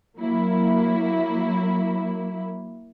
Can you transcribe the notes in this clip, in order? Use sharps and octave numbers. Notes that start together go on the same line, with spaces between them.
F#3 A#3 E4